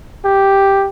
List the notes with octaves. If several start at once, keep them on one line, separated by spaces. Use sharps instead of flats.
G4